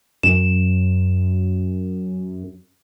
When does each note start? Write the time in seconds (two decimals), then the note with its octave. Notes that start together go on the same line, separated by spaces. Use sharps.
0.23 F#2 E7